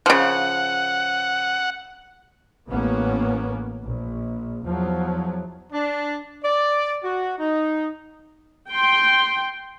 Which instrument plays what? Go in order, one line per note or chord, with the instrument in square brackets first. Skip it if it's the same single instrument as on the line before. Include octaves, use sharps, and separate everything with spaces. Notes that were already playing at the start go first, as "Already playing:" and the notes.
[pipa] C#3 F3 [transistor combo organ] F#5
[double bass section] A1 A#3 B3 C#4
A#1
E2 F3 F#3
[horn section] D4
D5
F#4
D#4
[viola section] G5 C6